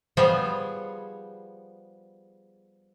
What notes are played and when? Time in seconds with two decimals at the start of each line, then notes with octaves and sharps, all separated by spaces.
0.17 F3 G3 B3 G#4 C5 C#5